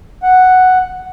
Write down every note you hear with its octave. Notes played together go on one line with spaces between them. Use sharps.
F#5